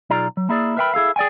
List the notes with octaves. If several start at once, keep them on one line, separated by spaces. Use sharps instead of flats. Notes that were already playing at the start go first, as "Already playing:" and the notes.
B1 D#4 F4 G#4 D5 A#5
F#3
A#3 E4 G#4 D5
A#4 B4 E5 F5 G5 B5
E4 G#4 A4 F5
G#4 D5 G5 G#5